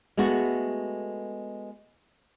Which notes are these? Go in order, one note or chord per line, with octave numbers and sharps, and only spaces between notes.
G#3 A3 B3 F#4